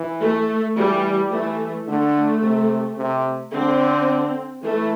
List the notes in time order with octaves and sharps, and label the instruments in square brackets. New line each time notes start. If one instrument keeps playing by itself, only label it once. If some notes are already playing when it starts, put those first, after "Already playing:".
Already playing: [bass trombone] E3
[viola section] A3
[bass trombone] E3 [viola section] G3
[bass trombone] E3 [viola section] A3
[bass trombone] D3 [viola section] A3
[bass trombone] C3
C3
[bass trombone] D3 [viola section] C4
[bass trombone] E3 [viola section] A3